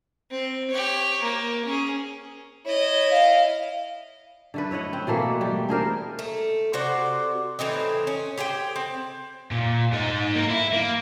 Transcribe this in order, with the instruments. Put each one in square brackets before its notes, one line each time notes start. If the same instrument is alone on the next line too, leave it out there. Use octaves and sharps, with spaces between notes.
[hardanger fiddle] C4
G4 C#5
A#3
C#4 G#4
[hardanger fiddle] E4 D#5 [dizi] C#5
[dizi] F5
[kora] D3 A3 B4
E4 C#5 D#5 F#5
C4
B2 E3 A3 A#3
G3
D4 G#4 A#4 C5
[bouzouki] A3
C3 F#4 C5 D5
A2 E3 C4 D#4
C#4
G4 G#4 C5 G5
C4
[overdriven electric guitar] A#2
G#2 D#4
A#3 A#4
E4
A#3